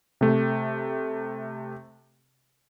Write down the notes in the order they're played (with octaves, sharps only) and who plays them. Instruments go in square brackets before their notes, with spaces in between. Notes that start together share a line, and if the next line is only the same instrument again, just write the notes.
[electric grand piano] C3 A3